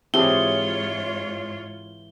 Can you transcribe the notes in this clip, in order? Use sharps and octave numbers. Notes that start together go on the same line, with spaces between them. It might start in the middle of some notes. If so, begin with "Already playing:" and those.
G#2 E3 C4 F4 G4 G#4 C#5 G7